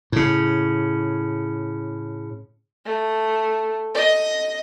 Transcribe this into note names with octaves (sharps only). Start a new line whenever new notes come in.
A2 C#3
A3
D#5